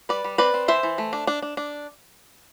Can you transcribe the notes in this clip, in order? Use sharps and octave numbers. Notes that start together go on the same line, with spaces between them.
G3 B4 D5
G3
C4 B4 D5
C4
E3 C5 E5
E3
A3
D4
D4
D4
D4